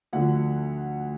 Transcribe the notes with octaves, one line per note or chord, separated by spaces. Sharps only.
D2 D3 F3 F#5